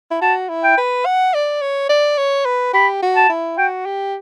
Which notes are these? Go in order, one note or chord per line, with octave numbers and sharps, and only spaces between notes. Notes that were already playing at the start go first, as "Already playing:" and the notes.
E4
F#4 A5
E4
G5
B4
F#5
D5
C#5
D5
C#5
B4
G4 B5
F#4
A5
E4
F#4 G5
G4